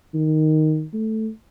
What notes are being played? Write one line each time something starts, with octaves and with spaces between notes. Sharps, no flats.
D#3
A3